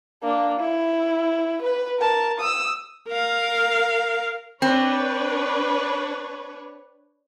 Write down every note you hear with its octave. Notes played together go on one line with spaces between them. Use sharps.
A#3 D4
E4
B4
A#4 A5
D#6 E6
A#4 F5
C4 D4 B4 C#5